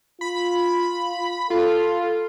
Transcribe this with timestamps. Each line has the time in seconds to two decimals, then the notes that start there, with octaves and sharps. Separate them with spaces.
0.21 F4 B5
1.50 F4 A4